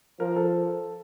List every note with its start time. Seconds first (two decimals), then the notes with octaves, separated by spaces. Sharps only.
0.20 F3 A#4
0.36 A4